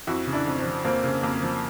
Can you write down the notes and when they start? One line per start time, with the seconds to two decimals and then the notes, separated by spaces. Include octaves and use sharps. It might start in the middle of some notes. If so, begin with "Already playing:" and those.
0.07 F2 E4 F#4
0.27 C#3
0.33 D4 E4
0.47 F2
0.58 C4 D4
0.66 F3
0.84 F2 A#3 C4
1.04 C#3
1.23 F2 A#3
1.42 F3